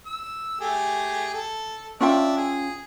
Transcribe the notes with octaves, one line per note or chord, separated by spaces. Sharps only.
E6
A3 G4 G#4
A4
C#4 D4 F4 E5 G5
G#4